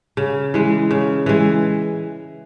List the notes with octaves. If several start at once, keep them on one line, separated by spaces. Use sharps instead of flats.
C#3
E3 G#3
C#3
E3 G#3